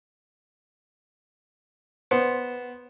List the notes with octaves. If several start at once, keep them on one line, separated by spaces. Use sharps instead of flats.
B3 C5